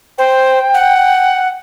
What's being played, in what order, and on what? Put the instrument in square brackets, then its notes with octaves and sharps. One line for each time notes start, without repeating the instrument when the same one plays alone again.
[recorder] C5 [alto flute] G5
[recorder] F#5